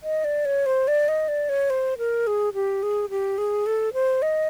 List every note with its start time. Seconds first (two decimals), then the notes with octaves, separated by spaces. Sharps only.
0.03 D#5
0.24 D5
0.45 C#5
0.66 C5
0.88 D5
1.08 D#5
1.28 D5
1.49 C#5
1.70 C5
1.98 A#4
2.27 G#4
2.54 G4
2.83 G#4
3.10 G4
3.38 G#4
3.66 A4
3.93 C5
4.22 D#5